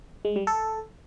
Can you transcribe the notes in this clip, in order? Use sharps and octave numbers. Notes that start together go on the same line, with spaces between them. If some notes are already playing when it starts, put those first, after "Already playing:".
G#3
G3
A4